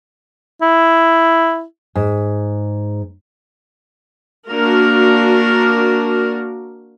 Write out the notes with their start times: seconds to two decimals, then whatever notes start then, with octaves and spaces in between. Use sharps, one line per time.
0.62 E4
1.96 G#2
4.50 A#3 D4 F#4 A#4